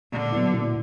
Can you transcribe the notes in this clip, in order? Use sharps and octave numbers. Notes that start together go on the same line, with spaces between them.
A#2 D3
F#3 B3 E4
A#2